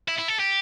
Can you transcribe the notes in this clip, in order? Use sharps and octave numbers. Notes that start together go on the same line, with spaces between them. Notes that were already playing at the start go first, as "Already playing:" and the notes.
E4
E4
A4
G4